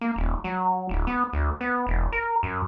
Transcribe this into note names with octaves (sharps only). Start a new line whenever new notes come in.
A#3
D#1
F#3
D1
B3
D2
B3
E1
A#4
F#2